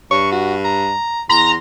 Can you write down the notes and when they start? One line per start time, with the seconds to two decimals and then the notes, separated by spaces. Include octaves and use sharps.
0.11 G2 C#6
0.32 F#4
0.65 A#5
1.30 E2 A#5 C6